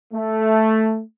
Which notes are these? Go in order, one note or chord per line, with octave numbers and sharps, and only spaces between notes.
A3